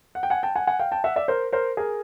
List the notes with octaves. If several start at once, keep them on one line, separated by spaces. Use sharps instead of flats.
F#5
G5
F#5 G#5
G5 A5
F#5 G#5
F#5 G#5
F5 G5
G5 A5
E5 F#5
D5 E5
A#4 C5
A#4 C5
G#4 A#4